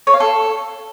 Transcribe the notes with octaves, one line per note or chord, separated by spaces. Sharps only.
C#5
F5
A4